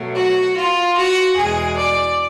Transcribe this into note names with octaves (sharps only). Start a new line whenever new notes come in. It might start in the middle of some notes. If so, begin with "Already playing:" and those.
Already playing: B2 F#3 A3
F#4
F4
F#4
E2 B2 G#3 G#4
D5